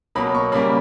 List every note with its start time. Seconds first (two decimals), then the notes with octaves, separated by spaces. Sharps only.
0.15 B2 F#3 A#3 B5
0.35 C#6
0.52 C#3 G3 A#3 B5